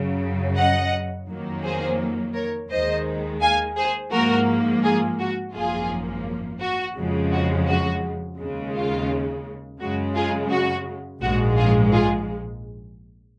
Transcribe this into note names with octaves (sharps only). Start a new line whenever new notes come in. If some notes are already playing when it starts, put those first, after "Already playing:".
Already playing: F#2 C#3 F#3
D#5 F#5
F2 D#3 F#3 A#3
G#4 C5
A#4 C#5
D#2 D#3 G#3 C5 D#5
F5 G#5
G#4 C5
G#2 F3 A#3 F#4 A#4
F4 G#4
F#4
G#1 F#2 F3 A#3 F4 G#4
F#4
F2 C#3 F3 G#3
F#4
F#4
D#2 C#3 G#3
F4
F#2 C#3 G#3 F#4
F4 G#4
F#4
A#1 G#2 F3 G#3 F#4
F4 G#4
F4 G#4